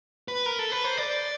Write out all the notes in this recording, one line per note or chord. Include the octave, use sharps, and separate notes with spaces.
B4
A#4
A4
B4
C5
D5